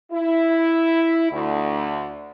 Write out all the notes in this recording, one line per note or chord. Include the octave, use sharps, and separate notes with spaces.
E4
D2